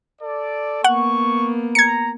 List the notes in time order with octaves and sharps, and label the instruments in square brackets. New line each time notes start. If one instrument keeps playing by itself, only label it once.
[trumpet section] A4 D5
[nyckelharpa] A#3 B3 [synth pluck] F#5 [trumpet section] C#6
[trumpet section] A#5 [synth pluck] G#6 C#7